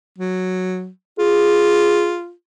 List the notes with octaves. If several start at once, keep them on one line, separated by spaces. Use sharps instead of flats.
F#3
F4 G#4